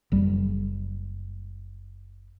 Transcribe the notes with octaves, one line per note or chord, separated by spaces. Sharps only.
F#1 G3